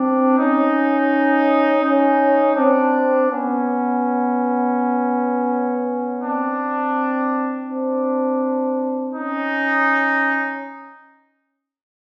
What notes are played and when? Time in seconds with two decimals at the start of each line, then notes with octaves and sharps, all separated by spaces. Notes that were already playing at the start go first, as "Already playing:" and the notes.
Already playing: C4 D4
0.38 C#4 D#4
1.84 C#4 D#4
2.57 C4 D4
3.30 B3 C#4
6.22 C4 D4
7.68 C4 D4
9.14 C#4 D#4